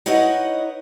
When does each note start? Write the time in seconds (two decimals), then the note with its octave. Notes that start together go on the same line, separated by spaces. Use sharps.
0.06 D#4 E4 B4 C#5 D#5 F#5